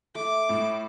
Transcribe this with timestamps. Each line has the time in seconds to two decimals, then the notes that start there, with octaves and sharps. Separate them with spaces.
0.15 A3 D6
0.49 A2